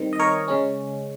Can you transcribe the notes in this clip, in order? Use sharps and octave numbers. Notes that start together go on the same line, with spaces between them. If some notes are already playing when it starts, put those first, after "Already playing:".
Already playing: D#3 G3 C4
D#5
A#4 C#5
C#3 G#3 C#4